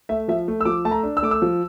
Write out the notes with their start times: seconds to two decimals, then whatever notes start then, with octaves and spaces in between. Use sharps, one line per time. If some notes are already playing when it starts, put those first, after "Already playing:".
0.09 A3 E5
0.28 F3 E5
0.48 A3
0.61 E6
0.65 F3 D6
0.85 A3 A5
0.91 A#5
1.03 D4
1.17 E6
1.23 A3 D6
1.31 E6
1.42 F3